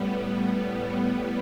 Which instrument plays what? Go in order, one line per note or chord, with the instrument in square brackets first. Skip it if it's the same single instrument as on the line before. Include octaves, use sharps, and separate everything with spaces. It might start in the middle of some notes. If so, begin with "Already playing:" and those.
Already playing: [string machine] A2 G3 B3